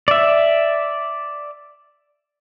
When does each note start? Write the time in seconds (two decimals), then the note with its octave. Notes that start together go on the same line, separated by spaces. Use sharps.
0.08 D5 E5